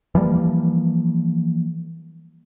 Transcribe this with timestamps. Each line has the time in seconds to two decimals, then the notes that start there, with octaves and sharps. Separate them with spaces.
0.15 E3 F3 G3 A#3